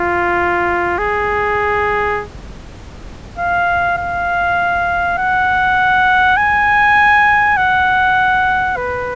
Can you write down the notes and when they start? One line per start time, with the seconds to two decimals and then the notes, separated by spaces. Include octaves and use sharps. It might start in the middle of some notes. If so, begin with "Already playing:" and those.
Already playing: F4
0.98 G#4
3.38 F5
3.98 F5
5.18 F#5
6.37 G#5
7.57 F#5
8.76 B4